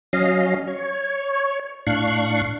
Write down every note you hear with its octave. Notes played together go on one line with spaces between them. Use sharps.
F#3 C#4 D#5 F5
C#5
A2 D4 F5 C#6 F#6